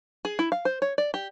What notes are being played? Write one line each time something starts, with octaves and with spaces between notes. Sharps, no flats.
G#4
E4
F5
C5
C#5
D5
G4